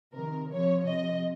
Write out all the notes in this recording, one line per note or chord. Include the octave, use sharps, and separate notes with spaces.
C3 D#3 A#4
C3 F3 C#5
C3 F3 D#5